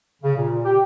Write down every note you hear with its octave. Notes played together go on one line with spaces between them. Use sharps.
C#3
A#2
G4